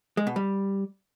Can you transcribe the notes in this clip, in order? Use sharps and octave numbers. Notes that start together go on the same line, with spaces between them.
G#3
B2
G3